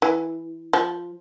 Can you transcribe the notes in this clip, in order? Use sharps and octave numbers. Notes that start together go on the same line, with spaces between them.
E3
F3